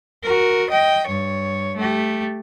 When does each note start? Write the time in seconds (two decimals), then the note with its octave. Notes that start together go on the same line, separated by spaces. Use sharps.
0.24 F#4 A#4
0.70 D#5 G5
1.07 G2 C#5
1.76 A3 G4